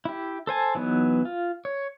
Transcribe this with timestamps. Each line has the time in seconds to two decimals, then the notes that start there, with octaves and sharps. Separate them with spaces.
0.05 E4 G4
0.47 A4 C5 G#5 A5
0.75 E3 F#3 B3 D#4
1.25 F4
1.65 C#5